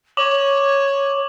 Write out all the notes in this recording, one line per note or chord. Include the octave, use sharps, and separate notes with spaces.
C#5 C#6 D6 F#7